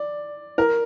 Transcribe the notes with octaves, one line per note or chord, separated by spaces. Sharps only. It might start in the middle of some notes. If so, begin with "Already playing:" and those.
Already playing: D5
A#4